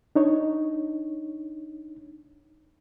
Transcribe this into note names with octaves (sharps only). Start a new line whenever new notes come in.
D4 D#4 C#5